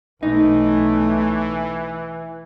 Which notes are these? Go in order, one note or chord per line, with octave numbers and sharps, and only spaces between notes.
B1 E3 A3 D#4